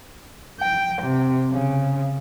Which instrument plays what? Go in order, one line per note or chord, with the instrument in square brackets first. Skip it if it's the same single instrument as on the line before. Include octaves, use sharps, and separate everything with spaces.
[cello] G5
C3
C#3